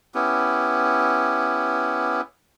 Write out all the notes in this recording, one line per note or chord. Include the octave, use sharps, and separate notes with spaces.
B3 C#4 E4 G4